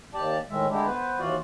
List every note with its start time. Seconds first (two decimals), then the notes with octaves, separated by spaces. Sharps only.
0.14 D#2 G4 D5 A5
0.50 A2 D#3 G#3 E5
0.70 D3 G#3 A3 D4 E4 G4
0.86 B3 B4 C5
1.19 D#2 E3 F4 F#4 D5